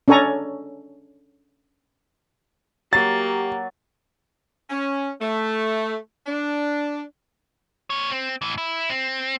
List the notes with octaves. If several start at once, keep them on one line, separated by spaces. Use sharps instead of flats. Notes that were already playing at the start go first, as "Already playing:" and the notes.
C#4 D4 A4 C#5 G#5 A#5
F#3 A#3 G4 A6
C#4
A3
D4
A#3 C#5
C4
A2 E3
E4
C4